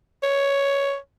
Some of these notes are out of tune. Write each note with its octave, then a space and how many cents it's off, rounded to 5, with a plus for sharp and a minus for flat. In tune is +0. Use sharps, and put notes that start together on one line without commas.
C#5 +5